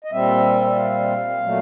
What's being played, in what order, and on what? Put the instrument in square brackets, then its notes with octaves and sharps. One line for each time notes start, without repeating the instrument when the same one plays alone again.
[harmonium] D#5
A#2 G3 C4 E5
E5
F5
A#2 F#3 A3